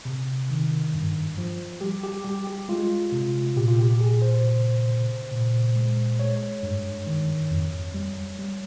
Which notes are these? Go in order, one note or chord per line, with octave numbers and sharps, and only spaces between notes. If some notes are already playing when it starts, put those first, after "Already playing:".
C3
D#3
G2
F3
G3 G4
G4
G3 G4
G4
G#3 F4
C3
A#2 G4
F4
G4
A#2 G#4
C5
C#3
C#3
A#2
G#3
G#3 C#5
G2
D#3
F2
G3
G3